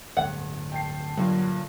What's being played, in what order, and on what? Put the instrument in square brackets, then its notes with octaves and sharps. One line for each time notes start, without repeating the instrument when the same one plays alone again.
[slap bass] D1 G1 G2 [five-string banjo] F#5
[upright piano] G5 A5 C7
[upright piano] G2 A#2 D3 [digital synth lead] F#3